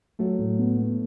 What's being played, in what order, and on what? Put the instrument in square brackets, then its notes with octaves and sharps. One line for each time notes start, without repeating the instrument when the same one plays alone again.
[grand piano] F#3 [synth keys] A3
[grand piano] A2
B3
B3